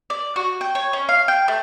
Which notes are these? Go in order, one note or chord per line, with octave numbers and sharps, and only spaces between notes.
D5
F#4
G5
C#5
C#4
F5
G5
A3